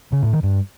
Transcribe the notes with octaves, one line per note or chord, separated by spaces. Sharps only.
C#3
A2
D#3
G2